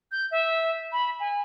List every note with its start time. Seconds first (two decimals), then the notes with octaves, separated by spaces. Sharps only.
0.12 G6
0.31 E5
0.92 B5
1.20 G#5